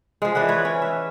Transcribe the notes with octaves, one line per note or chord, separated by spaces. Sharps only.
F3 G#3
E3 D4 B4 F#5
B4 C#5
C#4
E5